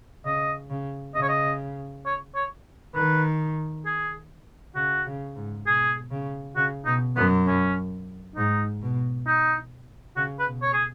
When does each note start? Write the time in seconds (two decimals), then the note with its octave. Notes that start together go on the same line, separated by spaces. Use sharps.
0.25 C#3 D#5
0.70 C#3
1.15 C#3 D#5
1.22 C#5
1.29 D#5
2.06 C#5
2.35 C#5
2.95 D#3 B4
3.86 G#4
4.75 C#3 F#4
5.06 C#3
5.36 G#2
5.66 B2 G#4
6.11 C#3
6.56 C#3 F#4
6.86 B2 D#4
7.16 F#2 B3
7.47 C#4
8.36 G#2 D#4
8.82 B2
9.27 D#4
10.16 C#3 F#4
10.39 B4
10.46 B2
10.62 C#5
10.73 G#4